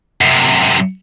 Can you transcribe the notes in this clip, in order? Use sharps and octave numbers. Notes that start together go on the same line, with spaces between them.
F#2 C3